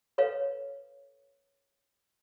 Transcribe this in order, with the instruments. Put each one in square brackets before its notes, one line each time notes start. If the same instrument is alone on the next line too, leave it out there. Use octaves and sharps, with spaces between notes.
[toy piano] A4 B4 C#5 F5